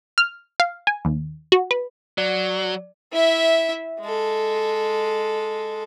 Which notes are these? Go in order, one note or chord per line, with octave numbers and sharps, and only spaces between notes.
F6
F5
G#5
D#2
F#4
B4
F#3 D5
E4 E5
G#3 A4